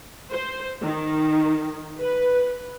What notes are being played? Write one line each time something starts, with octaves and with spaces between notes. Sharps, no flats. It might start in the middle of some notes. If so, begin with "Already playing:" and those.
C5
D#3
B4